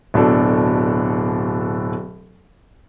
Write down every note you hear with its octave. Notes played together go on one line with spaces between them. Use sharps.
D1 B2 D4 A4